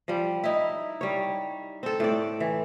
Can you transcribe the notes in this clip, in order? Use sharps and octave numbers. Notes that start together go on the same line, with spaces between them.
F3 G3
D#4 E4
G3 C#5
C4 A4
A2 C4 D5
E3